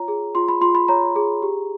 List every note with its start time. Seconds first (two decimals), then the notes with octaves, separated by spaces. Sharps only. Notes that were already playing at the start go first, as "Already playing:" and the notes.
Already playing: F4 C#5 A#5
0.08 G#4
0.35 F4 C6
0.48 B5
0.61 F4 C6
0.75 B5
0.88 C#5 A#5
1.16 G#4
1.42 G4